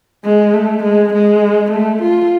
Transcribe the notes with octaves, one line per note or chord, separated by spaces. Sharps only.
G#3
A3
G#3
G#3
A3
F4